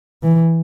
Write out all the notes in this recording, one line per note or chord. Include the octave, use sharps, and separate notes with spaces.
E3